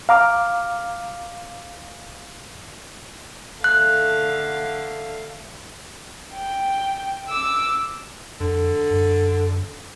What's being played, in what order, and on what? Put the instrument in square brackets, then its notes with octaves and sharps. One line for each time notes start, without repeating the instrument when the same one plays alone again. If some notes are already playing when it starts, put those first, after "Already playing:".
[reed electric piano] F5 A#5 D6 F6
[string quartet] D3 A3 F5 [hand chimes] F#6
[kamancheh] G5
D6 E6
[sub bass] F2 [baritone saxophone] D3
[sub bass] F#2